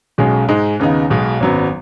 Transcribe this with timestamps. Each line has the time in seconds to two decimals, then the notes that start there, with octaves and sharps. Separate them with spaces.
0.18 B1 B2 G#3 C#4
0.48 G#2 G#3 D#4
0.79 D#2 C#3 B3 D#4
1.10 B1 B2 G#3
1.40 G#1 F#2 F#3 B3